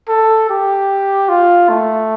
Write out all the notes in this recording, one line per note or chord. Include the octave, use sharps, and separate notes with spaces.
A4
G4
F4
A3